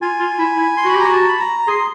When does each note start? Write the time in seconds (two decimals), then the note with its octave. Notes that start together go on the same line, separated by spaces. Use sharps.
0.02 F4 G#5
0.20 F4
0.39 E4
0.57 E4
0.77 C6
0.85 F#4 B5
0.95 G4 A#5
1.06 F#4
1.12 A5
1.29 B5
1.40 A#5
1.67 G#4 C6